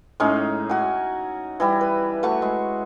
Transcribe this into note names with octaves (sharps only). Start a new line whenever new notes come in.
A2 G#3 C#4 D#4
F#4 G#5
E3 G3 E4
B4
A3 F#4 B4 C#6
G#3